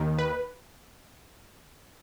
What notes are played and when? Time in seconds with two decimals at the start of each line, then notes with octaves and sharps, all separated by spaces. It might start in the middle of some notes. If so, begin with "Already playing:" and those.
Already playing: D#2 D#3
0.19 B4